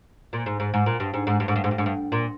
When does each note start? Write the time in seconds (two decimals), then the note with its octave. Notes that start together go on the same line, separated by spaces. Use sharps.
0.33 A#2
0.46 G#2
0.60 G#2
0.74 G#2
0.86 A#2
1.00 G2
1.14 G#2
1.27 G#2
1.40 G2
1.48 G#2
1.56 G2
1.64 G#2
1.71 G2
1.78 G#2
1.86 G2
2.12 A#2